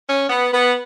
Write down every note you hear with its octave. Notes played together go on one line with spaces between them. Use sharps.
C#4
B3
B3